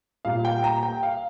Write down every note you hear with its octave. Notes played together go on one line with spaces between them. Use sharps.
A#2 G3 A#3 F5
G5
A#5
G5
F5